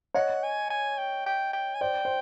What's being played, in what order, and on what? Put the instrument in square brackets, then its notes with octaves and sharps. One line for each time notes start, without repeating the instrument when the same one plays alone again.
[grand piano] C#5 D#5 [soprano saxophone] F#5
[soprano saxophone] G#5
G#5
G5
G5
G5
G#5
[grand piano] C5 D5 [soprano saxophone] G5
[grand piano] C5